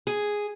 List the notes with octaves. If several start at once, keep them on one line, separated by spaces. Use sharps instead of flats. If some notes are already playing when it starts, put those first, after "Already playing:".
G#4